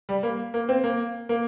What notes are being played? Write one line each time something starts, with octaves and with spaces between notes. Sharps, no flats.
G3
A#3
A#3
C4
A#3
A#3